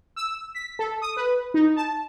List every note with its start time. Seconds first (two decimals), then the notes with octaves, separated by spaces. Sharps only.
0.16 E6
0.55 B6
0.79 A4
1.02 D#6
1.17 B4
1.54 D#4
1.76 A5